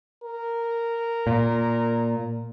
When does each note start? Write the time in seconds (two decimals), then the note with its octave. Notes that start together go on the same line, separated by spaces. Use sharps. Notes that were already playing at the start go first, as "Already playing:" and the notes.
0.24 A#4
1.27 A#2